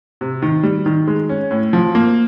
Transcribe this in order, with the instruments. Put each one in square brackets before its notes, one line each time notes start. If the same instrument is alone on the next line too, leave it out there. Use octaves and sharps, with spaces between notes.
[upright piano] C3
D#3
G3
D#3
G#3
C#4
A2
F3
A#3